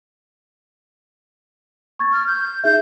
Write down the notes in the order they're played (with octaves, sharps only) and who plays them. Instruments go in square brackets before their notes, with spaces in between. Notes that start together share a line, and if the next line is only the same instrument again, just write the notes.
[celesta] C#6 G#6 A6
[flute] F6
G6
[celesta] D#4 G#4 E5 [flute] G6